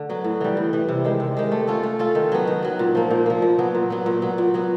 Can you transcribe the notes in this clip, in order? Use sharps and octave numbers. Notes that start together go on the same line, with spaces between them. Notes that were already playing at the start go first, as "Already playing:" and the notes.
Already playing: D3 A3
F#3 B3
A2
E3 G3
A2
E3 G3
C3
D#3 G#3
C3
D#3 G#3
A3
C#4 F4 A4
A3
C#4 F4 A4
D#3
F#3 B3
D#3
F#3 B3
A#2
F3 A#3
A#2
F3 A#3
A#2
F#3 B3
A#2
F#3 B3
A#2
F#3 B3
A#2
F#3 B3